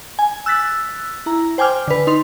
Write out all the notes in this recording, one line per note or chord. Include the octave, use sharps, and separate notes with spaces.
G#5
E6 F#6 A6 B6
E4 A#5
C5 G5 G#5 D6 F6
D3 B4
D#4 C6 F7